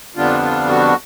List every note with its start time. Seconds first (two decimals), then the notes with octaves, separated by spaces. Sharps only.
0.16 F2 D3 G3 B3 D4 F4
0.42 F4
0.69 F#4